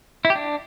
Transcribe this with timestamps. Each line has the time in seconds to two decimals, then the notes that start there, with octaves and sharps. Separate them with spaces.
0.25 E4
0.30 G4
0.35 D4